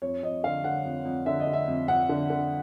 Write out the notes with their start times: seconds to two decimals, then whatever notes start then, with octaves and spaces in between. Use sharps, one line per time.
0.02 F2 C#5
0.23 F2 D#5
0.43 D3 F5
0.64 D3 F#5
0.85 F2
1.05 F2
1.26 D3 E5
1.40 D#5
1.47 D3
1.53 E5
1.67 F2
1.88 F2 F#5
2.09 D3
2.30 D3